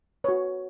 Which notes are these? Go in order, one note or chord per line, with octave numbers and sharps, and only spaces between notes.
F#4 B4 C#5